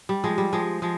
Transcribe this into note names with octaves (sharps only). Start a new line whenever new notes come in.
G3
F3 G#3
G3
F3 G#3
F3 G#3